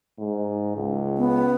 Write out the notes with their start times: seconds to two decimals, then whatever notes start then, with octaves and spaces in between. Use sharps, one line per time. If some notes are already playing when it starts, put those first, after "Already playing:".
0.19 G#2
0.76 C#2
1.18 B3